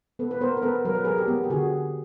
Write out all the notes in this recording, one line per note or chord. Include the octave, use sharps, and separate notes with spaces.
B3 A4 B4
B4
B3 A#4 C5
A#4
B3 A4 B4
F#3 A#4
B4
F#3 G#4 A#4
G4 A4
B3
G4
D3 F#4 G#4